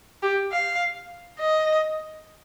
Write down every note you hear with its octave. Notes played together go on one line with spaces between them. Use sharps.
G4
F5
D#5